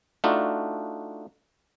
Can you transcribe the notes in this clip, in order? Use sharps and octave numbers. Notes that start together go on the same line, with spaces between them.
A3 D4 D#4 F4 F#4